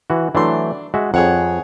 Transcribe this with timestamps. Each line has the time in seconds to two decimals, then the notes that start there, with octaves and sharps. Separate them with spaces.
0.10 E3 F#4
0.35 E3 F#3 A3 D4 C6
0.94 G#3 F#4 E5
1.14 F2 G#4 C#5 F#5